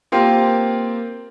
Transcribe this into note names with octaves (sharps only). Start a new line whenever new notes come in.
A#3 C4 F4 G4